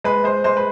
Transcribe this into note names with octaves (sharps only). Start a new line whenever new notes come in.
G#3 B4
G#3 C5
G#3 C5
B4